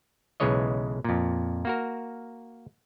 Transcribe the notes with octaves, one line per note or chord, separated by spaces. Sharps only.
B1 C#3 E3 G#3 C#5 D#5
F2 A#2
A#3 F#4 A#4